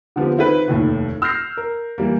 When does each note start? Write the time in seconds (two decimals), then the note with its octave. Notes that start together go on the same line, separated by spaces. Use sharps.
0.16 D3 F3 B3 G4
0.36 D#3 C4 E4 B4
0.68 F1 D#2 A2
1.22 E6 F6 G6 A#6 C7
1.57 A#4
1.98 E3 G3 A#3